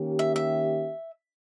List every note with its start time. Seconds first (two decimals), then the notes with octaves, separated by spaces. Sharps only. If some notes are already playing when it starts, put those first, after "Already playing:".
Already playing: D#3 A#3 C#4 G4
0.19 E5
0.36 E5